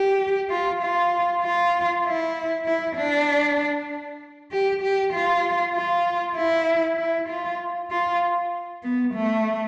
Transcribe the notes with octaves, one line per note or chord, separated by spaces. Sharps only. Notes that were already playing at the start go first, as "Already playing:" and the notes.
Already playing: G4
F4
F4
F4
E4
E4
D4
G4
G4
F4
F4
E4
E4
F4
F4
B3
A3